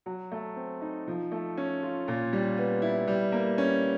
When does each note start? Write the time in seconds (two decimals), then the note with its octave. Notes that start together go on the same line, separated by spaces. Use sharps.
0.06 F#3
0.32 A3
0.56 C4
0.81 D#4
1.08 F3
1.32 A3
1.57 C#4
1.83 F4
2.08 A#2
2.33 G3
2.57 B3
2.82 E4
3.07 G3
3.32 A#3
3.58 C#4